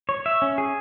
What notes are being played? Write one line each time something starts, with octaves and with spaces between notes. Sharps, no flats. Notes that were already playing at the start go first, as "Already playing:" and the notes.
C#5
E5
C#4
G#4